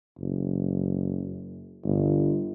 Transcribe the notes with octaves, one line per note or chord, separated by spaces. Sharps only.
F#1
G1